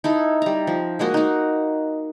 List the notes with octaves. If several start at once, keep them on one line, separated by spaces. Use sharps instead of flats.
D#4 E4 A4
G3 A#5
F3
G#3 A#3 F#4 D#5
D#4 F#4